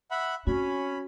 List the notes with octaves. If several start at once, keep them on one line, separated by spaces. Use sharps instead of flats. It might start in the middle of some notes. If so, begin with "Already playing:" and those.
E5 F#5 B5
C4 C#4 F#4 B5